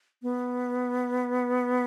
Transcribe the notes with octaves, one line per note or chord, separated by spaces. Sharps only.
B3